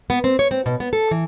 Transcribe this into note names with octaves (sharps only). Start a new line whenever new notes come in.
B3
C4
C#5
C4
B2
B3
A4
E3